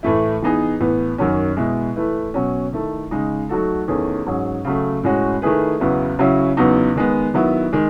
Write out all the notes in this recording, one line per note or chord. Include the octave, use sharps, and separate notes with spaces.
A2 E3 A3 E4
E3 B3 D#4 G#4
A2 E3 B3
F#2 D#3 F#3 C#4
B2 G#3 B3 E4
E3 A3 E4 B4
B2 F#3 C#4
D#3 A3 E4 A4
C#3 G#3 D#4
F#3 A3 D#4 F#4 A4
E2 D#3 A3 C#4 G#4
G#2 F#3 C#4 G#4
C#3 F#3 A3
A2 G#3 C#4 F#4
D#3 A3 E4 G#4 B4
E2 C#3 F#3 B3 E4
C#3 F#3 C#4 E4
E2 C#3 F#3 B3 D#4
D#3 G#3 B3
D#3 F#3 B3 E4
D#3 G#3